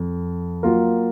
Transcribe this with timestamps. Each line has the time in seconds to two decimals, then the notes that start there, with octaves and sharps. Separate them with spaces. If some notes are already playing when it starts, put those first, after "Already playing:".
Already playing: F2
0.63 F#3 A#3 F4 A#4